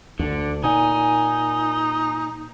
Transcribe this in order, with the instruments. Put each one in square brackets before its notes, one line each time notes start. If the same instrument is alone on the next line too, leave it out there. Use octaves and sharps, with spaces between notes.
[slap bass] D2 [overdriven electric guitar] D3
[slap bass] A#2 [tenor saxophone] D#4 [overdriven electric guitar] G#5